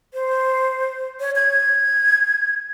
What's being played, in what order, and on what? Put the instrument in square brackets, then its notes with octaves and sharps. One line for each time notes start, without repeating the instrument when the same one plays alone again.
[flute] C5
C#5
G#6